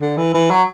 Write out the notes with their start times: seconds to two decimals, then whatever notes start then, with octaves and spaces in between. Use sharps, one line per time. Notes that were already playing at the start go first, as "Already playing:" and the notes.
0.01 D3
0.17 E3
0.34 E3
0.50 F#3